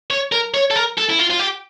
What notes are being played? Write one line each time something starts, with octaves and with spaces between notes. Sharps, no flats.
C#5
A#4
C#5
A4
A#4
A4
E4
F4
F4
G4